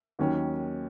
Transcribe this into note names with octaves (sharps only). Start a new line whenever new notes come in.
D#2 D#3 F#3 C#4